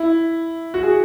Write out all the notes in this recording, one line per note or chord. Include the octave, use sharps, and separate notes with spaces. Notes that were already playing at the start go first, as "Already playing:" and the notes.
Already playing: E4
F#4
G#4